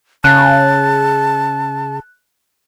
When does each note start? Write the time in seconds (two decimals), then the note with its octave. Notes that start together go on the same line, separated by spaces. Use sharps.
0.24 C#3 A5 F#6